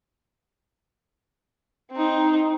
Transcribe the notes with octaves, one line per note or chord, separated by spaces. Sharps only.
C4 D#4